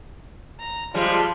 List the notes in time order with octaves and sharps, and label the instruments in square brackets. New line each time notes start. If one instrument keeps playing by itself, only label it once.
[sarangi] A#5
[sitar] F3 G3 G#3 [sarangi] F4